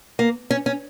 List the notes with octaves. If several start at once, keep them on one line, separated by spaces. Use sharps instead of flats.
A#3
C#4
C#4